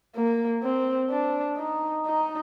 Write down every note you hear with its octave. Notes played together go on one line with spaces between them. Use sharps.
A#3
C4
D4
D#4
D#4